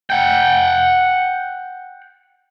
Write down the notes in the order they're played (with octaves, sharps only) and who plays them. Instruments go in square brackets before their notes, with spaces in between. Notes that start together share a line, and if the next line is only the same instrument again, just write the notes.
[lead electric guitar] F#5 G5